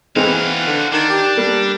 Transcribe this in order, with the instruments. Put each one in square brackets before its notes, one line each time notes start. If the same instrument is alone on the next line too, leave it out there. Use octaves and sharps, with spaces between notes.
[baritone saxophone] E3 [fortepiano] C4 D#4 G#4 [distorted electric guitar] F#4 F5
[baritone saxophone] D3
[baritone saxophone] D#3 [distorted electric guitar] D4
[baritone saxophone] G4
[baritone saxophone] G3 [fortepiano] A#3